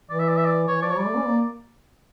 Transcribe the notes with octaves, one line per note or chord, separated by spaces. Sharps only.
E3 D5
E5
D5
E5
D5
E3 C#5
F3 D5
C#5
G3 D5
A3
C#4
A#3